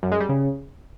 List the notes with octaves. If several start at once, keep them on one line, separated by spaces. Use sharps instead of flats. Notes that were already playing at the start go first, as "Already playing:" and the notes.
F#2
G#3
G3
C#3